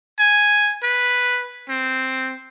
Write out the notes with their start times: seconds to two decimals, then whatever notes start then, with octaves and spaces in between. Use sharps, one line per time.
0.20 G#5
0.84 B4
1.69 C4